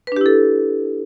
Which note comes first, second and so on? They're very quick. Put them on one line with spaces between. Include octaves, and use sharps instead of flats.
B4 D4 G4 E4 A4